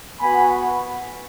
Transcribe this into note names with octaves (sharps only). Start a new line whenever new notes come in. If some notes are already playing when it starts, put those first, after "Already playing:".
B3 F#4 G#5 B5